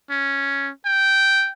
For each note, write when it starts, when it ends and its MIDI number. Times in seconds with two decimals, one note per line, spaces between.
0.10 0.71 61
0.86 1.51 79